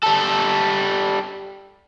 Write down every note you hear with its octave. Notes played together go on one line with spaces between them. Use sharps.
G3 A4